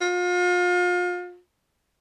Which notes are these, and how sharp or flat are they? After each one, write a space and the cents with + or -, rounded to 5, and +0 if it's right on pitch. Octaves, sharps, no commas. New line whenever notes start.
F4 +35